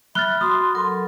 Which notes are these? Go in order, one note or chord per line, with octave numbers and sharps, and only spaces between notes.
E5 B5 F6 F#6 A6 G7
F#4 C6 D#6
F#3 A4 A#4